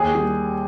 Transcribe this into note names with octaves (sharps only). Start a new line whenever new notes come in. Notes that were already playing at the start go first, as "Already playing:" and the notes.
Already playing: D#2 G#4
G3